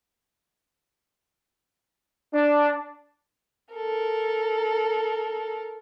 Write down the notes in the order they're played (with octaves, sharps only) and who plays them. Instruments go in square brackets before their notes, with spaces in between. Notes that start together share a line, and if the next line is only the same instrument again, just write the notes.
[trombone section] D4
[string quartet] A4 A#4